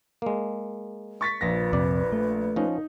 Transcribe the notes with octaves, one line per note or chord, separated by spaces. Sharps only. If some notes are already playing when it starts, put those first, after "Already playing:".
G#3 A#3
C#6 A6 B6
A#1 F3 B4 A#6
F2 C3 D5
A3
F3 C#4 D#4